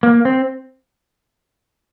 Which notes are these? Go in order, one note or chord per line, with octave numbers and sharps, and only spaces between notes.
A#3
C4